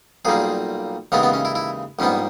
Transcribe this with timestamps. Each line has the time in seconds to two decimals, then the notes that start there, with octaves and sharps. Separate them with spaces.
0.25 B1 A#2 G3 A#3 G#4
1.12 D#2 C#3 E3 G#3 B3 C#4
1.23 B3
1.33 C#4
1.45 E4
1.55 E4
1.99 A#1 G#2 G3 B3 C#4